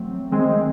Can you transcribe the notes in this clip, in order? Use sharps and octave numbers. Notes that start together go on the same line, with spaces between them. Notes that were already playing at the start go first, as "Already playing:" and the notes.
Already playing: F#3 A3 C4
D#3 G#3 C4